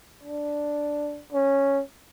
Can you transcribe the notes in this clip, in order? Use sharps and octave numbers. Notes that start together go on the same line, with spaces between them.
D4
C#4